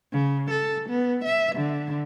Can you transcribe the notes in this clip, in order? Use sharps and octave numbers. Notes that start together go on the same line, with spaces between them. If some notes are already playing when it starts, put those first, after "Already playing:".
C#3
A4
B3
E5
D3